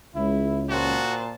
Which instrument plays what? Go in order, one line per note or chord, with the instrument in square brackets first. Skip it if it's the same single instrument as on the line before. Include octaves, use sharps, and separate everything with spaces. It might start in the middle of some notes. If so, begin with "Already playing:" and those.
[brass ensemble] C#2 [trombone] E4
[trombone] A#2 [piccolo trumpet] F#4 [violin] C5 A5